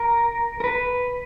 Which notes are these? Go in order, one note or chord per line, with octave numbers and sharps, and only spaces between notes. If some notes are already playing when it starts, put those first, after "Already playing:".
Already playing: A#4
A#4
B4